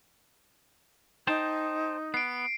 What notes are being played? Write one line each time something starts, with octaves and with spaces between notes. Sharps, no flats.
D#4 C5 G5 A5
B3 C7 D7